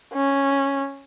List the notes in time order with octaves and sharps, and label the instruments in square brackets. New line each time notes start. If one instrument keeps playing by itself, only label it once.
[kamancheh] C#4